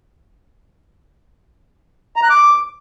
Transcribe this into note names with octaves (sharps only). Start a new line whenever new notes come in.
A#5
F#6
D6